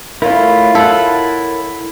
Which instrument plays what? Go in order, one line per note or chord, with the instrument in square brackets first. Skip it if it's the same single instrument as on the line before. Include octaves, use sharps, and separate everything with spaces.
[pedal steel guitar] A3 E4 [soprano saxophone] F4 [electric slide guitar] A#4 C#5
[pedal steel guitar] E4 F#5 [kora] A4